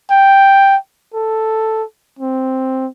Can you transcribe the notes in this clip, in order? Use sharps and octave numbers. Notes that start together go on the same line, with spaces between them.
G5
A4
C4